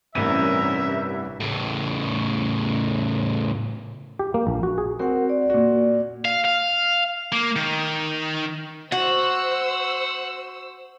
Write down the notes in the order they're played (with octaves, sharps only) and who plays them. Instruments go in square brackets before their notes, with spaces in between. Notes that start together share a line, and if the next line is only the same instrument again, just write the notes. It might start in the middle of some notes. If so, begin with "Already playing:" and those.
[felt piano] A1 D#7 [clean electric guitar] G2 C3 E3 [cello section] C#4 A#4 [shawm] E5
[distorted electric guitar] A2 C#3
[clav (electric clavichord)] G4
A#3
A#1
F#4
G#4
[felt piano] C4 F#4 [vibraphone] A#4 F#5
[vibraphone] D5
[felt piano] A#2 F#4
[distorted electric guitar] F5
F5
A#3
D#3
[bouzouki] F#4 [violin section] C5 E6 [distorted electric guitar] F#5